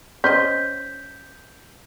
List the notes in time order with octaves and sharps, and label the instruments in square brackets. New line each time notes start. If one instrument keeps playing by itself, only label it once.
[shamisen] C#4 C5 D#5 [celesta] G6 B6